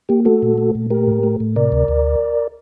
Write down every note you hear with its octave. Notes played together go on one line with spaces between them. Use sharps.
A#3 G4
A3 F#4 A4
A#2
A3
A#2
A3 G4 A#4
A2
A3
A2
C3 A#4 D5
D2
D2